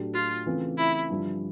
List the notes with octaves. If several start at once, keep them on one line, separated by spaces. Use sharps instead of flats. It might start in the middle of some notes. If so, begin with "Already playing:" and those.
Already playing: A2 F#3 A3 D4 G4
F4
C#3 E3 A3 C4 F4
E4
G2 D3 F3